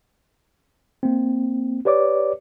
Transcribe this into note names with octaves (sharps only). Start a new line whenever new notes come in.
A#3 C4
G4 B4 C#5 D5 D6